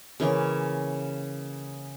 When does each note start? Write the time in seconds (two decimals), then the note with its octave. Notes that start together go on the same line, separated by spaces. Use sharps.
0.20 C#3 E3 A#3 C#4